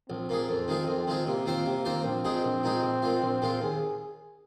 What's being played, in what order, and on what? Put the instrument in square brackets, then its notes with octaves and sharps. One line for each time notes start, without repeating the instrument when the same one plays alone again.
[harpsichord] A#1 [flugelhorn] C4
[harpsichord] A#2 A#3 G#4
F2
D#3 G#3 F4 G#4
F2
D#3 G#3 F4 G#4
[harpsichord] C3 [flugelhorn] A#3
[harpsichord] D#3 C4 F4 C5
C3
D#3 C4 F4 C5
[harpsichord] A#1 [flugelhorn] C4
[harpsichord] A#2 G#3 D#4 G#4
A#1
A#2 G#3 D#4 G#4
A#1
A#2 G#3 F4
A#1
A#2 G#3 F4
[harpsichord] D#2 [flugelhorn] G#4